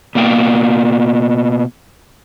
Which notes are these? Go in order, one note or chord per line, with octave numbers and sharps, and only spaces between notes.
B2 A#3 G5